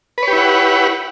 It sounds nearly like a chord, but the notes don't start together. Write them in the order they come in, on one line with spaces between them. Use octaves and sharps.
B4 C#5 G4 E4 F#5